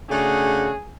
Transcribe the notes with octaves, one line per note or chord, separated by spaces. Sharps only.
C#3 A3 D4 F#4 G#4